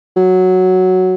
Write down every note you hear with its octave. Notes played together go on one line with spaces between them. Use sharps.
F#3